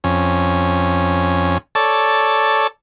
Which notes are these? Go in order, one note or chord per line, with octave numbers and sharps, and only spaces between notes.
F2 C#4
A4 C#5 D5 A5